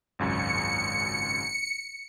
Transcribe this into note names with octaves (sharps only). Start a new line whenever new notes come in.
G#1 C#2 F#2 C#7